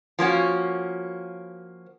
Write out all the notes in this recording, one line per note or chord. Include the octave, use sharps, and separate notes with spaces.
F3 A#3 C#4 F#4